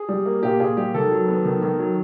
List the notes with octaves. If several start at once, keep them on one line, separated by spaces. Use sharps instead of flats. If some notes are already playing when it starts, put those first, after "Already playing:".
Already playing: G#4
G3
A#3
A#2 G4
A#2 G#4
G3 G4
D#3 A4
F#3
B3
D#3
D#3
F#3